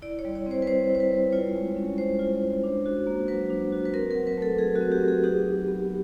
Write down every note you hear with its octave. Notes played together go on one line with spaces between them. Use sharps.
E4 D5
C#5
G3
C#5
C4 C5
B4
G3 C5
E4
C5
B4
G3
F4 C#5
G#3
C#4
G#3 C5
F4
G#3
D4
F#4
A#3
F#3 B4
D4
F#4
B4
C4 A#4
F#3 A#4
B4
A3 A4
F#3 G#4
F#4
C4
G4
F#3
G#4
D#4 G4
F#4
B3